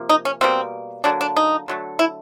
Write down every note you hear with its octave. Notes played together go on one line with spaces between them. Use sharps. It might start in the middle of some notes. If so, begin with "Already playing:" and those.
Already playing: C3 F3 A#3
D#4
C#4
B2 G3 A#3 C4
D3 F#3 A#3 D4
D4
D#4
D3 F#3 A3
E4